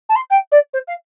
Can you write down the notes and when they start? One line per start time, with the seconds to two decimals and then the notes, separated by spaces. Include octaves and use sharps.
0.09 A5
0.16 C6
0.31 G5
0.52 D5
0.74 C5
0.88 F5